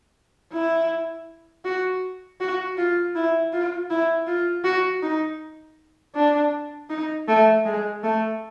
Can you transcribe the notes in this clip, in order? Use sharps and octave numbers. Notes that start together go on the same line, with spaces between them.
E4
F#4
F#4
F4
E4
F4
E4
F4
F#4
D#4
D4
D#4
A3
G#3
A3